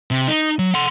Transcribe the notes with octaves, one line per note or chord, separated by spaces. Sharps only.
C3
D#4
F#3
F#5 C6